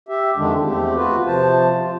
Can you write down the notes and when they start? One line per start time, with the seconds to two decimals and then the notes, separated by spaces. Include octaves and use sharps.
0.09 G4 E5
0.37 F2 D3 D#3 G#3 D4
0.65 E2 A3 C4 G4
0.95 F4 F#4 B4
1.27 C3 F3 C5 A5
1.80 F4